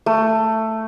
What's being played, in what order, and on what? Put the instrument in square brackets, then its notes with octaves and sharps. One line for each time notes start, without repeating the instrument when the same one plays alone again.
[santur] A3